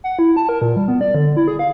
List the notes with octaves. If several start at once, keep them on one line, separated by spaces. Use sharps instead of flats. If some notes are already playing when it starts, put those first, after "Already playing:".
F#5
E4
A5
A#4
A#2
G3
B3
D5
D3
E4
G#4
F5